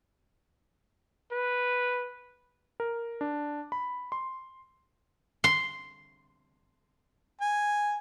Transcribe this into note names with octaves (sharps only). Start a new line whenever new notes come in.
B4
A#4
D4
B5
C6
C6
G#5